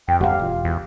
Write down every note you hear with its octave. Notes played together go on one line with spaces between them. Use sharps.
F2 G5
G1 B2 F3 G4 F5 F#5
E1 F4
E2